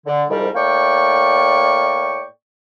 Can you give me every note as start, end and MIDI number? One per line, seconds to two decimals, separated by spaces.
0.06 0.25 50
0.29 0.48 36
0.29 0.48 41
0.29 0.48 44
0.29 0.48 55
0.29 0.48 70
0.55 2.24 45
0.55 2.24 58
0.55 2.24 74
0.55 2.24 79
0.55 2.24 85